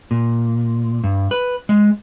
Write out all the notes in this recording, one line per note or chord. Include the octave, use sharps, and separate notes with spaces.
A#2
G2
B4
G#3